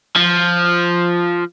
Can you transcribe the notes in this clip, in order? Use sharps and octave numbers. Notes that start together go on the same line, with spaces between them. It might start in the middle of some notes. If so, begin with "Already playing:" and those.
F3